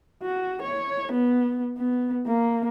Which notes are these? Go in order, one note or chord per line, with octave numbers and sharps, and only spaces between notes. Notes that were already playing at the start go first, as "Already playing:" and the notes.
F#4
C#5
B3
B3
A#3